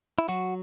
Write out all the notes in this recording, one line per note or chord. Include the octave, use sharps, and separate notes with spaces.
E4
F#3 F#4